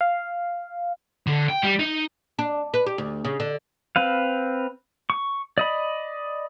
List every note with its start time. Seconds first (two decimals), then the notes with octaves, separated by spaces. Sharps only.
0.01 F5
1.27 D3
1.48 G5
1.63 G3
1.79 D#4
2.39 D4
2.74 B4
2.86 G4
2.98 D2
3.25 C#3
3.40 D3
3.96 C4 B4 F5
5.10 C#6
5.58 D5 D#5 B5